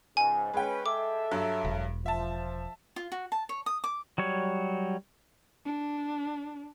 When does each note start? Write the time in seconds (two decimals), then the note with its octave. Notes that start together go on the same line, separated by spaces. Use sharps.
0.17 C#2 G#2 G#5
0.54 G#3 C#4 B4 G5
0.86 A4 E5 D6
1.31 G2 F#3
1.65 E1
2.06 F3 E5 A5
2.96 F4
3.12 F#4
3.32 A5
3.49 C#5
3.66 D#6
3.84 D6
4.18 F#3 G3 C#5
5.65 D4